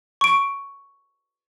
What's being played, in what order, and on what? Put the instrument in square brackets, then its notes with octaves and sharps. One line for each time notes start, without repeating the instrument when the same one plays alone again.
[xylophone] C#6 D7